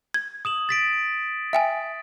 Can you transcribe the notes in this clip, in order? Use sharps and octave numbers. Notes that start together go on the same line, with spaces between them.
G#6
D#6 E7 F#7
A6 B6 D7
E5 G5 G#5